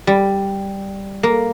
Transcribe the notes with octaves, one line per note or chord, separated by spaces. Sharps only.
G3
A#3